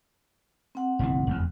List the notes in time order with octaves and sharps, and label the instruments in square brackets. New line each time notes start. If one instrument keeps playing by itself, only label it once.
[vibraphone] C4 F#5
[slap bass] F#1 B1 E3
F1 E2